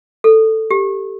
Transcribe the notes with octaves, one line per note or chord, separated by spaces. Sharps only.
A4
G4